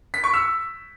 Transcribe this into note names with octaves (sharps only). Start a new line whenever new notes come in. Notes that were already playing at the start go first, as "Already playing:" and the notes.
B6
C#6
E6